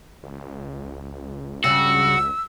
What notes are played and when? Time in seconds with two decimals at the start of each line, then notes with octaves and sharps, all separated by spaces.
0.23 C#2
1.64 G2 C#3 F#4 E6